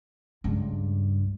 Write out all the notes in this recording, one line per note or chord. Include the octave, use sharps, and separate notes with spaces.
C#2 G2